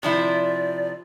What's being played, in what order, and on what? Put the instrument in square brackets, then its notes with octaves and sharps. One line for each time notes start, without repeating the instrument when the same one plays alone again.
[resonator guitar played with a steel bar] C3 F3 E4 [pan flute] D5